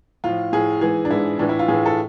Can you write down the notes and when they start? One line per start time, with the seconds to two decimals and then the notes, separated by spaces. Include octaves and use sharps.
0.24 A2 F3 F4
0.53 A2 F3 G#4
0.81 G#2 E3 G#4
1.05 D4
1.11 G#2 E3 E4
1.39 A2 E3 D4
1.49 E4
1.59 F4
1.68 A2 E3 G#4
1.86 A4